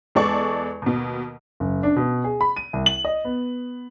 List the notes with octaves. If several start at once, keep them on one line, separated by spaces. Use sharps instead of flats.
E2 G#3 A4 D5 C#6
D#2 B2
F#1
D4
B2
G#4
B5
D#7
C2
F#7
D#5
B3